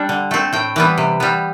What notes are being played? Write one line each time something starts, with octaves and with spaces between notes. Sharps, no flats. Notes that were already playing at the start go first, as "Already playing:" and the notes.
Already playing: G3 D4
D3
A3 C4
A2 G5
E3 G3 B3
C3
G3 B3